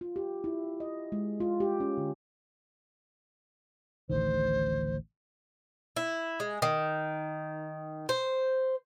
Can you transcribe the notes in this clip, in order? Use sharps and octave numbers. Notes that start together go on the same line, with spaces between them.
F4
G4
E4
D#5
G#3
F4
G4
C#4
D3
A1 D2 D#3 C5
E4
G#3
D#3
C5